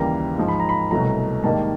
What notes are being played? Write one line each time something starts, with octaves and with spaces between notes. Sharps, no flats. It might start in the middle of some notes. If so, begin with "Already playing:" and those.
Already playing: D#2 C#3 E3 G3 A#3 A#5
G#2 F3 G#3
B5
A#5
B5
C2 B2 F#3 A3 A#5
G#2 D#3 G3 A#3 A5